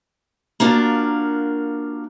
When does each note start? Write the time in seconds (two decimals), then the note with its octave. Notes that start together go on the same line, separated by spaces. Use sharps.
0.60 A#3 B3 D4 F4 F#4 A#4